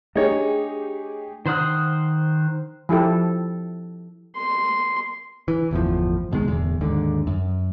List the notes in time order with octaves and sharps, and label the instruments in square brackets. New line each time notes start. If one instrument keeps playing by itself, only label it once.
[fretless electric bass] A3 D4 [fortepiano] D#4 C#5 [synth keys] G4 G#4
[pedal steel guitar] D#3 C5 F#5 D#6 F6
[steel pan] F3 E4 G4 A4
[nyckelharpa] C6
[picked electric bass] E3
G1 E2 A2 F3
C2 B2 D#3 G#3
D1 E2
D#2 G#2 D3
F#2